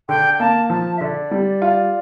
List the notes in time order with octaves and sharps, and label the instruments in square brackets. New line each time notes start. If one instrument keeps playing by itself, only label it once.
[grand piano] D3 [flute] G5
[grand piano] A#3 [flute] A5
[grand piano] F3 [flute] A5
[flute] E5
[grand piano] D3 [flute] D5
[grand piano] G3
F4